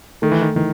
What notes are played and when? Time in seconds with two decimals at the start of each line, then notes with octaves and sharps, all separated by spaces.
0.22 D#3 A3
0.32 E3
0.42 D#3
0.56 D#3 E3